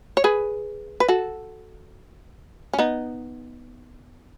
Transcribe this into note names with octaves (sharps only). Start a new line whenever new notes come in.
C#5
G#4 B4
B4
F#4 A4
C#4
B3 D#4